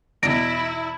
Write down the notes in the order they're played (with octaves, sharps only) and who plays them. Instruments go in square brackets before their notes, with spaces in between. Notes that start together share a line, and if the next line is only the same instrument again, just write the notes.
[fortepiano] E2 B2 [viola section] E4 [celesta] A#6 D7